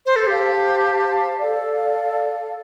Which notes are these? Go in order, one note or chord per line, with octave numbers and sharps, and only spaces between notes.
C5
A4
G4 C5 F5 A5
A4 D5 F5